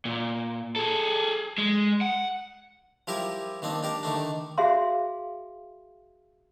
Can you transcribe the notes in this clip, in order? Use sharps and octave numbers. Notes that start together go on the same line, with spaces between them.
A#2
G#4 A4
G#3
F#5
F3 G3 E4 G4 A#4
D#3 A#3 C4 D4
D4 G4 A#4
D3 D#3 A3 D4
F#4 G#4 E5 F5 C6